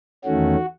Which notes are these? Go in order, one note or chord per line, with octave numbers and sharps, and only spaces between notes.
E2 D#3 A3 C#4 F#4